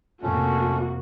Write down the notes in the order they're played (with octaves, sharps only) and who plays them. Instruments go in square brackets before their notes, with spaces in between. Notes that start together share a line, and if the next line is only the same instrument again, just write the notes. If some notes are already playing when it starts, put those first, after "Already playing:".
[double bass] F2 C3 [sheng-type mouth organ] A3 C#4 [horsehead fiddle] A#3 F#4